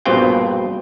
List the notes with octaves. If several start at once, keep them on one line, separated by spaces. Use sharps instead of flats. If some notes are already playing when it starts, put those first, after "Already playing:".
A#1 G2 B2 C4 F4 G5